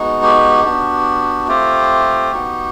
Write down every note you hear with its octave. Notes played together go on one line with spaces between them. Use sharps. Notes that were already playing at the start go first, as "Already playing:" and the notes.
Already playing: G#3 B3 D#4 F#4
G4
B3 D4 F#4
A3 C4 F4 G4
B3 D#4 F#4